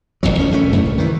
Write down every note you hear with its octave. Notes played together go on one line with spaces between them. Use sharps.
D#1 G#1 F2 F#3
G#1 D#3 C#4
E1 A3 C#4
F#2 A2 D3
C2
D#3 E3